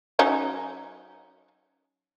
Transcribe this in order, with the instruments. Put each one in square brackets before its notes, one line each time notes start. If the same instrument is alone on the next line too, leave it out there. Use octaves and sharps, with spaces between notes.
[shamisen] F#3 C#4 D#4